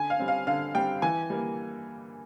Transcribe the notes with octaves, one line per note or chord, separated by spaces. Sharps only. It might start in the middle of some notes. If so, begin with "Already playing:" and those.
Already playing: D3 G#5
F5
G3 C4
F5
D3 F5
G3 C4 G5
E3 G#5
G3 A#3